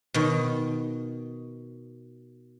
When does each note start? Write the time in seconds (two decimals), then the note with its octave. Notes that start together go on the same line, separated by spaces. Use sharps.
0.14 B2 D#3